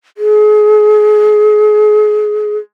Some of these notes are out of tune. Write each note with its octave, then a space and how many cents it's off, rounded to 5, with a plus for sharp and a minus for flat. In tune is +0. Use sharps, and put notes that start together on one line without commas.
G#4 +30